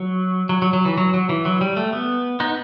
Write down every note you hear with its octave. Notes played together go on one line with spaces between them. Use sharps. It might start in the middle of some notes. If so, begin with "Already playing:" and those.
Already playing: F#3
F#3
F#3
F#3
E3
F#3
F#3
E3
F#3
G3
A3
B3
B3 D#4